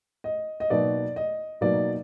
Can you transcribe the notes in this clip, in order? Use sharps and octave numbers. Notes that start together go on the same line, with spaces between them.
D#5
D#5
B2 F#3 A#3 D#4 D5
D#5
B2 F#3 A#3 D#4 D5